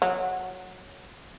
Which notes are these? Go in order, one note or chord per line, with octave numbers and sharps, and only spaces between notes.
F#3